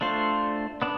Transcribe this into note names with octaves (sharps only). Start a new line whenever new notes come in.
A3 D4 F4 C5
B3 D4